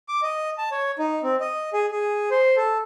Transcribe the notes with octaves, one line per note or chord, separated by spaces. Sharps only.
D6
D#5
A5
C#5
D#4
C4
D#5
G#4
G#4
C5
A4